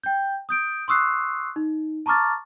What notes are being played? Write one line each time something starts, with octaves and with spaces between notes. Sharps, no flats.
G5 G6
D#6 G6 D7
C6 C#6 D#6 E6 F#6 C7
D#4
A5 A#5 C#6 D6 F6 A6